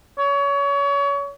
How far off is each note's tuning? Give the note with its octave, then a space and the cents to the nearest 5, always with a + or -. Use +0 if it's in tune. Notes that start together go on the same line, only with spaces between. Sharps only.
C#5 +30